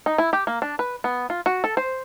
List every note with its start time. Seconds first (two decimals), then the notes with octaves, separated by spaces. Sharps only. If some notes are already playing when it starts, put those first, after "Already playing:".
0.06 D#4
0.18 E4
0.33 G4
0.47 A#3
0.62 D4
0.79 B4
1.04 B3
1.30 F4
1.46 F#4
1.64 A4
1.77 C5